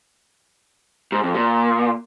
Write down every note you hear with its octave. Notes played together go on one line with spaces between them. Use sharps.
G#2
F2
A#2